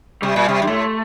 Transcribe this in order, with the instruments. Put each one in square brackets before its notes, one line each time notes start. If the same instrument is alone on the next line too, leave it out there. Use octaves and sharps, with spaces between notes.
[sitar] C3 [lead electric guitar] G3
[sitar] A#2
C3
G2
[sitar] A2 [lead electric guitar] A3